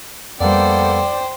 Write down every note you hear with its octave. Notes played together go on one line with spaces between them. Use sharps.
F2 G3 A#3 B3 A4 C5 D5 G5